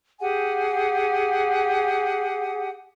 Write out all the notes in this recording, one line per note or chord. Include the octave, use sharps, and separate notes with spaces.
G4 G#4 F#5 G#5